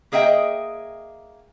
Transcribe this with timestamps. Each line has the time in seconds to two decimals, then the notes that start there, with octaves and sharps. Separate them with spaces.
0.12 A#3 G#4 D#5 E5 G5